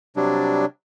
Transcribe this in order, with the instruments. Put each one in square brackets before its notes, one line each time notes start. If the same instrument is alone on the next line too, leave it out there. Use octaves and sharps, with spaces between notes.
[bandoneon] C3 F#3 G3 D4